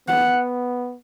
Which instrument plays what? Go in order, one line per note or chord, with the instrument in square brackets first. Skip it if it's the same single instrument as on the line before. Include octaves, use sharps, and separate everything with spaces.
[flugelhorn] B3 [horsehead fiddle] F#5